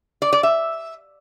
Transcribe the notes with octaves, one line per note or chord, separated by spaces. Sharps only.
D5
D5
E5